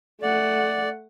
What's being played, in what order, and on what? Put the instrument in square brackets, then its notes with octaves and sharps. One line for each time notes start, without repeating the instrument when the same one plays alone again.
[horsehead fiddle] A3 F#5 [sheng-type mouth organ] D5